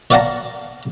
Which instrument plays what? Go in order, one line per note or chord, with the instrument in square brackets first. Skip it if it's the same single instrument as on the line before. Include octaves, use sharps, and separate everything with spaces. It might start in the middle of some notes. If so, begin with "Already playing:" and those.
[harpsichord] C#5 D5 F5 F#5 A5 A#5